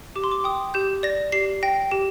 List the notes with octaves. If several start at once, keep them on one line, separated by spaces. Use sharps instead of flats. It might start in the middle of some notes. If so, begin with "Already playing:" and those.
G4 D6
C6
D6
G5 D#6
G4 G6
D5 A#6
G4 C7
G5 A#6
G4